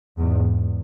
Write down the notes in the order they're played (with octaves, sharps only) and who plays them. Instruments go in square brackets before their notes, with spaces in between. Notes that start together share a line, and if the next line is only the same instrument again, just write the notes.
[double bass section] E2 G#2